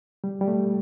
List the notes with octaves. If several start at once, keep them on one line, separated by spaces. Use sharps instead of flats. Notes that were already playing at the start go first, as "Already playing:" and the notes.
G3
G3
A3